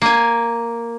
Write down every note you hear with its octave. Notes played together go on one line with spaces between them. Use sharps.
A#3 G#5